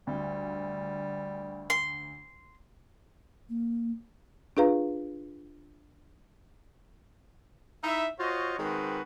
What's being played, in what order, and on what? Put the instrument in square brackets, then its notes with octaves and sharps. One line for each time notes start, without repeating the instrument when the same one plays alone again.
[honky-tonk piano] D2 [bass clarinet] G3
[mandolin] C6
[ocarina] A#3
[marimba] D4 F4 G#4 B4 F5 A#5
[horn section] D#4 E4 E5
F4 F#4 C5 C#5 D#5
D#3 G#3 C4 F#4 B4